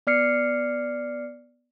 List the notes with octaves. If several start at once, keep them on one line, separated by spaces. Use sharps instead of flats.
B3 D5 F6 C7 C#7